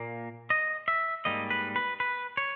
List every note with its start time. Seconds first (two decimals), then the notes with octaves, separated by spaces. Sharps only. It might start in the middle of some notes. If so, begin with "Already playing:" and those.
Already playing: A#2 A#3
0.50 D#5
0.88 E5
1.25 G#2 G3 A#3 D#5
1.50 B4
1.76 B4
2.00 B4
2.37 C#5